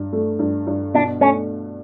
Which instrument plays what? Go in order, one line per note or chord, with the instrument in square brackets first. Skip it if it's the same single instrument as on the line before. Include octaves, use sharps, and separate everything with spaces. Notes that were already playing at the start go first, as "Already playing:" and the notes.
Already playing: [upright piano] G2
A3
G2
G2
[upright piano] B2 [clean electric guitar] D4
[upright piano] A3 [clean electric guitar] C#4